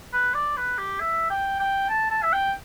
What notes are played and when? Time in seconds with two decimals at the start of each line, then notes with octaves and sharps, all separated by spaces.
0.13 B4
0.34 D5
0.57 B4
0.78 G4
1.00 E5
1.30 G5
1.59 G5
1.89 A5
2.10 A5
2.23 E5
2.33 G5